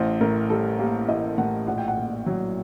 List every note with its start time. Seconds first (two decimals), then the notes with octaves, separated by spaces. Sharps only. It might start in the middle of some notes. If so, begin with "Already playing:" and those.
Already playing: A1 C5
0.21 A2 A#4
0.50 G3 A4
0.79 A#3 G4
1.08 A1 D#5
1.38 A2 F#5
1.67 A#1 F#5
1.78 G5
1.88 F#5
1.96 A#2
2.26 F#3